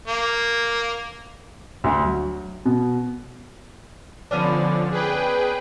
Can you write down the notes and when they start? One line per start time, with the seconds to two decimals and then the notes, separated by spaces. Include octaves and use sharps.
0.08 A#3
1.84 D2
2.05 F#3
2.65 B2
4.31 D3 F3 B3 C#4 D4
4.91 G#4 B4 G5